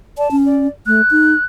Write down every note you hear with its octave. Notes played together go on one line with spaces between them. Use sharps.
D5 A5
C#4
D5
A3 F#6
D#4